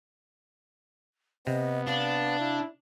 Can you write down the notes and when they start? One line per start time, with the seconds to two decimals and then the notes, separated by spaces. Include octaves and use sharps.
1.47 C3 B3 D#5
1.87 D4 F5
2.40 E4